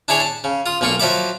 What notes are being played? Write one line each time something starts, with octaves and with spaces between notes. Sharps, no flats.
D4 E4 G#4 C#5 D5 G#5
A5
C#3
F4 D#6
B1 A#2 A#3 F4 C#6
F3 F#3 D5 E5 B5 D6